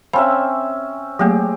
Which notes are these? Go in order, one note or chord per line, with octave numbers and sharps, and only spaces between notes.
C4 C#4 E5 F5 A5 B5
F#3 A3 A#3 G4 G#4